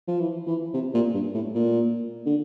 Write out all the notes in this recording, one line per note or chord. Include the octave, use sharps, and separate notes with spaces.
F3
E3
E3
C3
A#2
G2
A2
A#2
D3